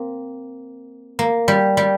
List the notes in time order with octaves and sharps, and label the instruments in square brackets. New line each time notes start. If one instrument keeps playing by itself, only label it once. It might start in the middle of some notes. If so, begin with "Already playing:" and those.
Already playing: [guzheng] A#3 C4
A#3
G3
G3